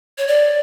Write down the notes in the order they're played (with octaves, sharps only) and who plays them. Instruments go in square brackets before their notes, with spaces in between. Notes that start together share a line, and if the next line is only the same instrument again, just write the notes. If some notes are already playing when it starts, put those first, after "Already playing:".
[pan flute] C#5
D5